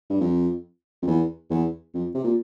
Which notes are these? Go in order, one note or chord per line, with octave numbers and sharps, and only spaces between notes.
G2
F2
F2
E2
E2
F2
C3
A#2